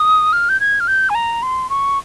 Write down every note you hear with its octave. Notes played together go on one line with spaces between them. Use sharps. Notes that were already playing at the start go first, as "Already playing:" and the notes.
Already playing: D#6
F6
G6
G#6
F6
G6
G#5
A#5
C6
C#6